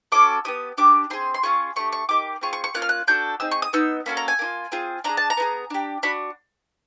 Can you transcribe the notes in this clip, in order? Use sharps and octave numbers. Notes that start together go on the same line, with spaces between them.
C#4 F#4 A4 D6
B3 D#4 G4 D#6
D4 G4 D6
C4 F4 G#4 C6
C6
C#4 F4 G#4 C#6
A3 D4 G4 C#6
C#6
A#3 D#4 G4 D6
C4 F4 G#4 C#6
C#6
C#6
A#3 C#4 F4 F#6
F6
F#6
D4 F#4 A4 G6
C4 D#4 G#4 E6
C#6
D#6
B3 D#4 E6
A#3 C#4 F#4 A4 B5
A#5
G#5
A#3 D4 F4
C4 F4 G#4
D4 F4 G#4 A#5
A5
A#5
B3 E4 G#4
D4 G4
D4 F#4 B5